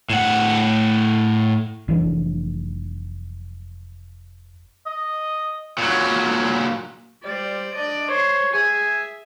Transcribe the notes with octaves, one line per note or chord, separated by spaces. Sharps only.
A2 F#5
F1 E3 F#3 D4
D#5
A#2 F#3
G3 C5 D5
D4 D5 D#5
C5 C#5 C6
G#4 E5 G#5